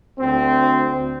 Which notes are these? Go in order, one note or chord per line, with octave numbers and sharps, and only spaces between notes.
D2 C4